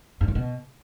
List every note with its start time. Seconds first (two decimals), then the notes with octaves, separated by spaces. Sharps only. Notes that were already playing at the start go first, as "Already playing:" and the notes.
0.21 G2
0.28 A2
0.35 B2